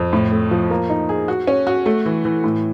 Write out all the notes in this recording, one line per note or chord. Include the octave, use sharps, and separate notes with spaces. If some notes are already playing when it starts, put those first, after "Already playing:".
Already playing: F2
A2
A3
F3
A#3
D#4
G#4
F#4
C#4
F#4
A3
E3
E3
A2